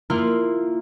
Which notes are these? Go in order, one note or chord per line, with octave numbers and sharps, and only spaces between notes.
A#3 E4 F4